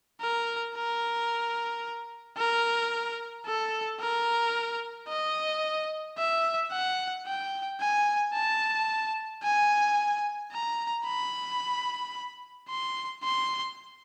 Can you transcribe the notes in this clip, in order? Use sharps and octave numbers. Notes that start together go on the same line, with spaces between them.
A#4
A#4
A#4
A4
A#4
D#5
E5
F#5
G5
G#5
A5
G#5
A#5
B5
C6
C6